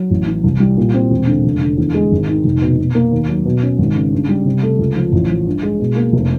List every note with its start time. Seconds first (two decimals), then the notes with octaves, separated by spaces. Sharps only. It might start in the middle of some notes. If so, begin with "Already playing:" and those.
Already playing: F#3
0.11 A1
0.27 E3
0.44 C2
0.60 G3
0.77 A#2
0.94 C4
1.11 E1
1.27 D3
1.45 F1
1.61 D3
1.78 E2
1.94 G#3
2.12 G#1
2.28 D#3
2.45 F1
2.62 B2
2.78 B2
2.95 A#3
3.11 D#2
3.29 F#3
3.45 B2
3.63 C#4
3.78 G#1
3.95 C#3
4.13 G2
4.29 G3
4.46 C3
4.63 A3
4.79 C#2
4.96 F3
5.13 A1
5.29 F3
5.47 G2
5.63 G#3
5.79 B2
5.96 A#3
6.13 F1